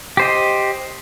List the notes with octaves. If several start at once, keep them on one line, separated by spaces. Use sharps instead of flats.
G4 C5 D#5